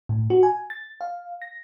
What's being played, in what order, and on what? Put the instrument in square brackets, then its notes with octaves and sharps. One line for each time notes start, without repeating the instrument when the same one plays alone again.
[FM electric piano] A2
F#4
G#5
A6
F5
A#6